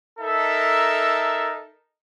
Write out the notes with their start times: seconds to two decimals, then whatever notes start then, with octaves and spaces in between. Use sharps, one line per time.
0.19 D#4 A4 A#4 E5